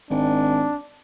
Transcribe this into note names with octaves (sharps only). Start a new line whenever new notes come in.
G#1 D4